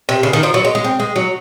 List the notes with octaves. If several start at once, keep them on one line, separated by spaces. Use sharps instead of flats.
C3
C#3
D#3
F3
F#3
G#3
G#3
C4
G#3
F#3